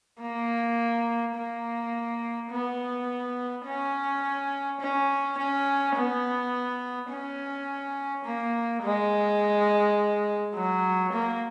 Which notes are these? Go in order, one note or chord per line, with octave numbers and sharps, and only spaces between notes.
A#3
A#3
B3
C#4
C#4
C#4
B3
C#4
A#3
G#3
F#3
A#3